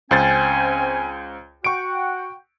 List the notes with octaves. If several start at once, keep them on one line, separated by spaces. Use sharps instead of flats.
C#2 C4 C#4 C5 G#5 A6
F#4 F#5 G5 C#6 D7